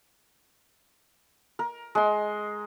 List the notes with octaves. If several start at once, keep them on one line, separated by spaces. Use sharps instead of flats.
A#4
G#3 C6